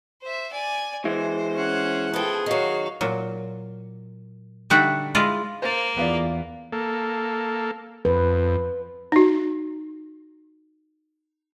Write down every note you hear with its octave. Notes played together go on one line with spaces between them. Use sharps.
C5 E5
D5 G#5
E3 G#3 C5
C#4 F#5
F3 B3 G#4 A4 G5
D#3 F#3 F#4 F5
A#2 F#3
D3 G3 D#4 F#4 E5 F#5
G#3 E4 F4 D5 D#5
A#3 C5 A6
E2 B3 F4 D5
A#3 A4
F2 B4
D#4 F#4